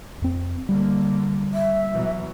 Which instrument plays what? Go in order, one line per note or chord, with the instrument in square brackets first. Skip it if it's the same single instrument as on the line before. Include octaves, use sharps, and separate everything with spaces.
[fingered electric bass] F2 C4
[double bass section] D3 A#3 [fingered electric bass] G3
[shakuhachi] E5
[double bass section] B2 E3 F#3